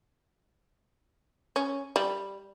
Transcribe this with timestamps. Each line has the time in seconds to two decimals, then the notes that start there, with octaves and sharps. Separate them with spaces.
1.56 C#4
1.96 G3